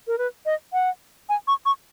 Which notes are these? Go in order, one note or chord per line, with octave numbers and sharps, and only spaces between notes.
A#4
B4
D#5
F#5
G#5
C#6
C#6